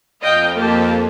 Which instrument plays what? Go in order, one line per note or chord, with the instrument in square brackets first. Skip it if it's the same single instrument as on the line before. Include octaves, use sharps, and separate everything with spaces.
[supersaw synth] F2 [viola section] D#5 F5 G5
[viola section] A#3 G4 A5